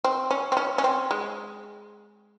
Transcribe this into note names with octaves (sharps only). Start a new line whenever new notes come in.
C4
C#4
C4
C#4
C#4
C4
G#3